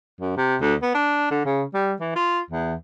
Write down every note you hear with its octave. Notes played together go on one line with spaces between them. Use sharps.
F#2
C3
D2
B3
D4
D3
C#3
G3
E3
F4
E2